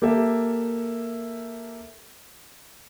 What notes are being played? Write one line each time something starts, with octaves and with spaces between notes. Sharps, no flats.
A#3 G4 A4 E5